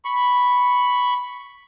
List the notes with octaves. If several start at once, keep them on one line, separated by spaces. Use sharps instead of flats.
B5 C#6